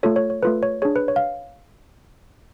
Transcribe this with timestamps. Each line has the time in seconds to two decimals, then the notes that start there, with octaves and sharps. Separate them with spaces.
0.03 A3 F4 A4 C#5
0.16 C#5
0.30 C#5
0.43 A3 F4 A4 B4
0.63 C#5
0.82 D4 G#4 C#5
0.96 B4
1.08 C#5
1.16 F5